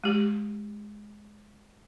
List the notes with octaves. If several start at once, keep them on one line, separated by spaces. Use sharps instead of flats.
G#3 G4